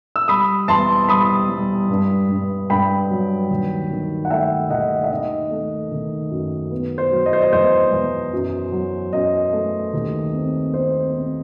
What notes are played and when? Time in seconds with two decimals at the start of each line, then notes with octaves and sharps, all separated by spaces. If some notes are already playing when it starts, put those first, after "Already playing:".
0.16 E6
0.28 G3 B5 D#6
0.68 E2 A5 C6
1.09 G3 B5 D#6
1.48 G3
1.90 G2
2.29 G2
2.70 G2 G5 B5
3.10 F#3
3.51 D#2
3.90 D#3
4.25 F#5
4.30 A3 E5 G5
4.70 D#2 D#5 F#5
5.04 E5
5.11 D#3 D#5
5.51 A3
5.91 D#3
6.31 F#2
6.71 B3
6.98 C5
7.12 F#3
7.26 D#5
7.33 C5
7.42 D#5
7.52 E2 C5
7.92 E2
8.33 F#2
8.72 F#3
9.13 F#2 D#5
9.53 A3
9.94 D#2
10.33 C4
10.74 C4 C5
11.14 C4